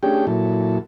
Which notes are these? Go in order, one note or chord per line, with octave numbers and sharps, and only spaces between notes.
A3 C#4 D4 G4 G#4 G5
A#2 F#3 E4 A4